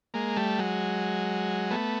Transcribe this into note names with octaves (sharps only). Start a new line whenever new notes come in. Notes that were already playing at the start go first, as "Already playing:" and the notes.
G#3 A#3
G3 A3
F#3 G#3
A3 B3